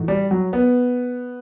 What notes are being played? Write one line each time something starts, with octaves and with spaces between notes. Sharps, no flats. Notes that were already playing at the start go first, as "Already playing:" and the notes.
Already playing: A2 E3 A3 D#4 F#4
G3
F#3
B3